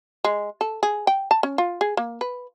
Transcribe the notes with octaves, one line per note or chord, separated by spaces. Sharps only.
G#3
A4
G#4
G5
A5
C#4
F4
G#4
A#3
B4